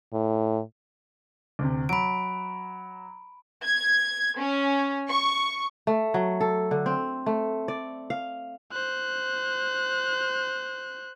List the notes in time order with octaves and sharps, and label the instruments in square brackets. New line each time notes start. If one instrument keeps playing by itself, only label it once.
[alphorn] A2
[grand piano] D2 C3
[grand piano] F#3 [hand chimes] B5 D7
[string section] G#6
C#4
C#6
[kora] A3
F#3
A4
D3
C4
A3
D5
F5
[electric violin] C5 F#6